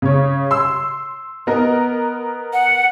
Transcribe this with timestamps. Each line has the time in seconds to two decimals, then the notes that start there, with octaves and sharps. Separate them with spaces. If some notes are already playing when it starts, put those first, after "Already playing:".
0.02 C#3 C#5
0.51 C6 E6
1.47 B3 A#4 D#5
2.53 F#5